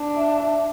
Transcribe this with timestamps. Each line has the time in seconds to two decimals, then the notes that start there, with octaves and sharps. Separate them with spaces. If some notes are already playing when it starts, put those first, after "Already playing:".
Already playing: D4
0.15 E5
0.37 E5